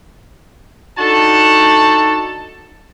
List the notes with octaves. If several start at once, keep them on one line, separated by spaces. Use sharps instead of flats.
D4 D#4 F#4 A4 A5